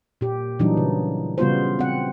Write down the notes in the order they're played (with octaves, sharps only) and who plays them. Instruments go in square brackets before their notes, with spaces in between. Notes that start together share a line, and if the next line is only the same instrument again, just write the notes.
[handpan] A#2 G4
A#2 E3 F#3 G3 D4 D#4
C#3
C#3 G3 B3 F4 F#4 C5
C4 F#5